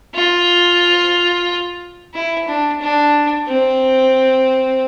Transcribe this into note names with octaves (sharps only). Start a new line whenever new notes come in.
F4
E4
D4
D4
C4